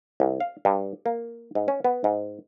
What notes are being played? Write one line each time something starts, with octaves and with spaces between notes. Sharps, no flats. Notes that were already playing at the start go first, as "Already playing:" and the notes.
C2
F5
G2
A#3
G#2
C#4
B3
G#2